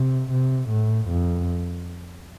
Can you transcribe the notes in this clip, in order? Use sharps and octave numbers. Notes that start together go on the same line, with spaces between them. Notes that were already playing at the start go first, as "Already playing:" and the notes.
Already playing: C3
C3
A2
F2